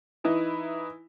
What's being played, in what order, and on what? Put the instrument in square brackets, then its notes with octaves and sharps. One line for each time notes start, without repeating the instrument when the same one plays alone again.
[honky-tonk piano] E3 D#4 E4 B4